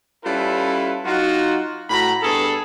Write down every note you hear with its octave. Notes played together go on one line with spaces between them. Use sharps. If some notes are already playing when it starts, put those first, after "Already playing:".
G3 C#4 E4 F4 A4 B4
F#3 D#4 F4 F#4
A2 F#4 A#5 B5
G2 B3 G#4 A4